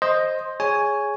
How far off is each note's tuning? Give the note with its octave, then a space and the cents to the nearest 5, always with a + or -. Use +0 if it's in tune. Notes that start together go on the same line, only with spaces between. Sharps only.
C5 +10 D#5 +0
G#4 +0 C#5 +10 G#5 +0